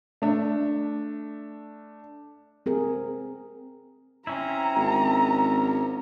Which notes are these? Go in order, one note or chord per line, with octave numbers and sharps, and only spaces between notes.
A3 D4
C4 G#4 A#4
C4 C#4 E4 A#5
G#1